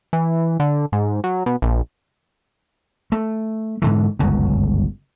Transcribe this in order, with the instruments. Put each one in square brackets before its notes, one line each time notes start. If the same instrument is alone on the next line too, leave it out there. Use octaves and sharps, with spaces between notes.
[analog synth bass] E3
D3
G#2
F#3
B2
A#1
[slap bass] A3
G#2 D3 E3
G1 C#2 F#2